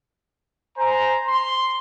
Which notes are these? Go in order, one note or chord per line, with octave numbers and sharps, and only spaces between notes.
C5 G#5 A#5
C6